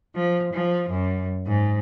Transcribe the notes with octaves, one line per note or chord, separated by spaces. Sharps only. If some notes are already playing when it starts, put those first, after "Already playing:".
F3
F3
F#2
G#2